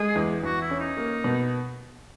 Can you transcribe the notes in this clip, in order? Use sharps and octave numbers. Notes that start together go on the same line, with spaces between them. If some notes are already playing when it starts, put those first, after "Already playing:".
Already playing: G#3 G#4
E2
E2 F#4
E4
C#4
D#4
A#3
B2